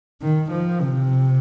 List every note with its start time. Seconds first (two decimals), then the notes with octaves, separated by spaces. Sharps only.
0.22 D#3
0.51 F3
0.81 C3